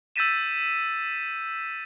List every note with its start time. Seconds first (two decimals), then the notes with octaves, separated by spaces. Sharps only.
0.16 E6 G6 A6 B6 D#7 E7